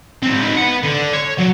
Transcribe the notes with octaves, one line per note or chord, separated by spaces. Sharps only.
G#3 C4
D#4 B4
B4 F#5
D3
C#5
F#3